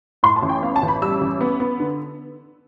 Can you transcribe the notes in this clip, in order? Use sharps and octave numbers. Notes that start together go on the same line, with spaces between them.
A2 C6
A5
A1
G5
B3 F5
A5
A1
B5
G3 E6
A1
B3
B3
D3